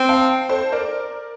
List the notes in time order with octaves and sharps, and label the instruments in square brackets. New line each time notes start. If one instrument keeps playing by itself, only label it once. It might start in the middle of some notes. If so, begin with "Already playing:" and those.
Already playing: [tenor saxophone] C4
[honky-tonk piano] F5 A5
A4 C5
A#4 D5